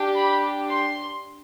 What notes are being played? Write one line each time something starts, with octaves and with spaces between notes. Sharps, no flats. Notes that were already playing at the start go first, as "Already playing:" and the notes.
Already playing: D4 G4
B5
C6